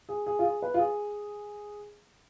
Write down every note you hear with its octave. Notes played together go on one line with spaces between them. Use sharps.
G#4
G#4
F4
G#4
B4
F4
G#4